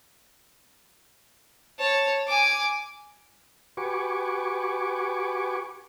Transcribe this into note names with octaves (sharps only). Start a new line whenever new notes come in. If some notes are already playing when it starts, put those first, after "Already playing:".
C#5 A5
G#5 D6
F#4 G4 B4 G#5 C#6 D6